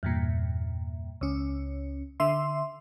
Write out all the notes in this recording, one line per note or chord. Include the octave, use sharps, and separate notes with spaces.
E2 G2 A#2
C#2 C#4
D3 E5 C6